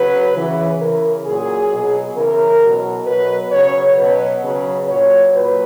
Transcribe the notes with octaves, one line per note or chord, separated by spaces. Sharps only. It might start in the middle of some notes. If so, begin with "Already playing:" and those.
Already playing: C#3 F#3 B4
C#3 E3
C#3 E3 A#4
A#2 F#3 G#4
B2 F#3
C#3 E3 A#4
B2 F#3
B2 F#3 B4
C#3 F#3 C#5
B2 F#3 B4
C#3 F#3 B4
A#2 F#3 C#5
A#2 F#3 B4